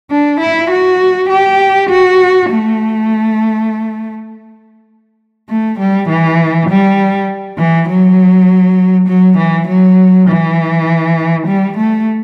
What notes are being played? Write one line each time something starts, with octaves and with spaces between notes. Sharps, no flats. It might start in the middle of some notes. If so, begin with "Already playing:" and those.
D4
E4
F#4
G4
F#4
A3
A3
G3
E3
G3
E3
F#3
F#3
E3
F#3
E3
G3
A3